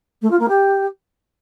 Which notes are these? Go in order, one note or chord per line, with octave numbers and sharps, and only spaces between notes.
A3
F4
A#3
G4